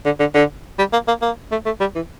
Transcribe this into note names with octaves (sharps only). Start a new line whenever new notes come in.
D3
D3
D3
G3
A#3
A#3
A#3
A3
A3
G3
E3